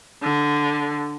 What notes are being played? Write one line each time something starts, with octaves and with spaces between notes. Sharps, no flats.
D3